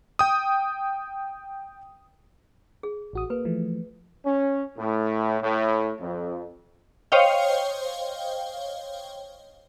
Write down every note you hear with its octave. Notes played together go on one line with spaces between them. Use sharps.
G5 D#6
G#4
A1 F#4 D#6
A#3 B4
E3 F3 A3
C#4
A2
A2
F2
C5 C#5 D#5 F5 G5